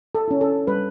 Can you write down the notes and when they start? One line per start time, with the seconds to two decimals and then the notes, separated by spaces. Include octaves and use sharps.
0.15 A4
0.28 C#4 E4
0.41 A4
0.67 G3 B4